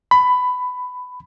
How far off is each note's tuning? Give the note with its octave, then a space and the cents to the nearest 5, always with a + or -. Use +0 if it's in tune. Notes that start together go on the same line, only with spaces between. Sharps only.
B5 +15